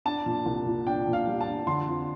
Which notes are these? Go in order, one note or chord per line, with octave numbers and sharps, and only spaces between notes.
D4 A5
A#2
C2
A#2
D4 G5
A#2
F5
G3
A5
D4
D3 C6
F2